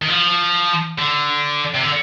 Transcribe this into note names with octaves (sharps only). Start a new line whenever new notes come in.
D#3
F3
D3
C3
D3